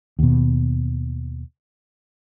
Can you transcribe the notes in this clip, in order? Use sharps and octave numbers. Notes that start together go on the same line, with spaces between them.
D#2 B2